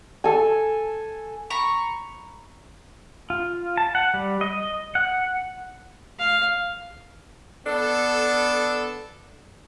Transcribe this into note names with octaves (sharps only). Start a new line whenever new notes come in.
A4 G#5
A#5 B5 C#6
F4
A5
F#5
G3
D#5
F#5
F5
B3 D4 A4